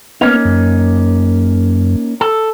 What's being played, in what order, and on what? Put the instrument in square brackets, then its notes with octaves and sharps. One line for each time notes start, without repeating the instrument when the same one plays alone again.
[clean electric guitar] A#3 C#4 D#4 [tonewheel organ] B3 F6
[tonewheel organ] F#2
[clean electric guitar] A4